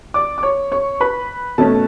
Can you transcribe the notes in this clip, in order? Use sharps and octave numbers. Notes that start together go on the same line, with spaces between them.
D5 D6
D6
C#5 C#6
C#5 C#6
B4 B5
B2 A3 C#4 A4 A5